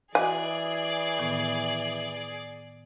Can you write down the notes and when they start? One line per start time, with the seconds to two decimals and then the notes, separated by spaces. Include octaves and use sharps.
0.15 E3 F#4 G#4 D5 D#5 G#5 D6
1.19 A2 D#3 B3